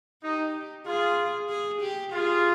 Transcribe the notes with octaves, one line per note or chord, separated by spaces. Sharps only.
D#4 G4
F4 G#4
G#4
G4
F4 G#4